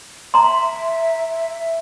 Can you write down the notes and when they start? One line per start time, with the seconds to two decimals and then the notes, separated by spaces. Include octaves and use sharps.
0.34 E5 A#5 C6